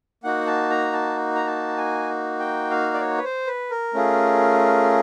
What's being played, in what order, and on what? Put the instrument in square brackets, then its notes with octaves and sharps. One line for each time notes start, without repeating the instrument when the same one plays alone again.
[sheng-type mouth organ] A#3 D#4 F#4 F#5
A5
A#5
A5
A#5
A5
G#5
G5
F5
D5
C#5
B4
C5
B4
A#4
A3 C#4 F4 G#4